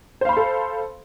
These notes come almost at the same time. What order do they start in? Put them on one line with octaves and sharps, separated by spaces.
C5 F5 B5 C6 A4